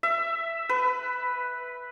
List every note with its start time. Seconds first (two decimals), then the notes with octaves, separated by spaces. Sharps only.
0.03 E5
0.69 B4